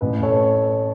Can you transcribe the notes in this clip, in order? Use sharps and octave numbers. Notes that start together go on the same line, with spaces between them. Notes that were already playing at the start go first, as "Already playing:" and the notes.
A1 B4
A4 C#5